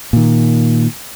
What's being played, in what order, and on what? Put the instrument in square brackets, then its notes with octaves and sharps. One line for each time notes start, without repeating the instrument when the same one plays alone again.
[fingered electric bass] A#2 D#3